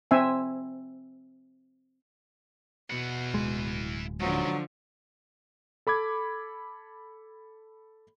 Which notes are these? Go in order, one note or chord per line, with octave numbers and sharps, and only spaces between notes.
C4 E5 G#5
B2 E4 F#5
D1 G#3
G#2 D3 F3 F#3
A4 B5 D6 G#6